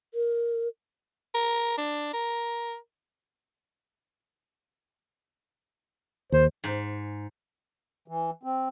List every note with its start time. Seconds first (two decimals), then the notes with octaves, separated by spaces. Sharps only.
0.14 A#4
1.34 A#4
1.78 D4
2.13 A#4
6.32 D#2 C5
6.64 G#2
8.08 E3
8.43 C4